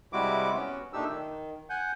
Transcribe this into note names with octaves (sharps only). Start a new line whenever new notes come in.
C3 G3 G#3 E4 F#4 D6
B3 C#4 F#4
A#2 A3 D4 D#4 G4 E6
D#3
F#5 G#5 G6